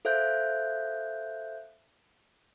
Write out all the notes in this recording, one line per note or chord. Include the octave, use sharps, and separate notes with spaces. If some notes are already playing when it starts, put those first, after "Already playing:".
A4 C5 E5 F5 F#6 G6